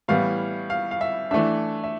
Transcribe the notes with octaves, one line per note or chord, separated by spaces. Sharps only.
A2 E3 G3 B3 F5
F5
F5
E5
E3 A3 D4 E5
E5